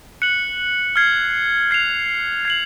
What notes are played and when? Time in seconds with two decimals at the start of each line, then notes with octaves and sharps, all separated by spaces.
0.22 F#6 C#7 F#7
0.96 F6 G#6 C7
1.71 G#6 C7 F7
2.45 G#6 C7 F#7